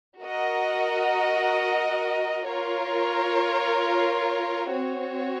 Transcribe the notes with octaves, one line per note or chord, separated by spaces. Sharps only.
F#4 A#4 D#5 F#5
F4 A#4 C#5
C4 F#4 C#5